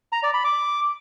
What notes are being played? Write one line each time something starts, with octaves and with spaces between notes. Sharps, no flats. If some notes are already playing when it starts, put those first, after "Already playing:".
A#5
D5
B5
D6